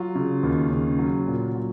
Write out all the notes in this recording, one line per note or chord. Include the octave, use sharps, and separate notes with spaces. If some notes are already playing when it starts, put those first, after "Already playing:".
Already playing: F#3 F4
C#3
D#2
C#3
F#3
A#2
F#3